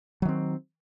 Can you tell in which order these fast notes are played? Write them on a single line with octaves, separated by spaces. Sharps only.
F#3 D#3 C4